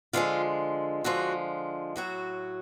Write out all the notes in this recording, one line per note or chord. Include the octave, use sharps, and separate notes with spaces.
D3 F3 G#3 F4
D3 F3 G#3 F#4
A2 F#3 F#4